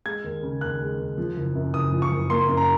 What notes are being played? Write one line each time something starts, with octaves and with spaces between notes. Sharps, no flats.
G#3 G#6
D#2
C#3
D#2 F#6
G#3
D#2
F3
F#1
F#2
F#1 D#6
F3
C#6
F#1
A#3 C6
F#2
A#5